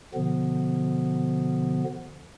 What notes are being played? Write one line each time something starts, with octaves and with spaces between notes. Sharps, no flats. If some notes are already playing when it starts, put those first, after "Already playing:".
B2 D3 F3 B3